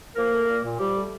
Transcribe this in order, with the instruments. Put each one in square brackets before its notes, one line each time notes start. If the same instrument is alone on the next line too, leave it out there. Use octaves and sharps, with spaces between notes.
[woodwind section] F3 A#3 A#4
A3
A#2
A#2
F3 G3 G4
A3